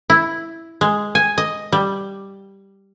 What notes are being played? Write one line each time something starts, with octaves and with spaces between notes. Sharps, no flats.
E4
G#3
G#5
D#5
G3